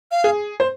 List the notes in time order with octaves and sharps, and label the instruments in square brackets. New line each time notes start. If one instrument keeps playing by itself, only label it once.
[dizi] F5
[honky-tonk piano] G#4
C5